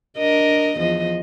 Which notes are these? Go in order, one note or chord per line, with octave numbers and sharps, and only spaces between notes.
D4 A#4 D#5
E2 F3 D#5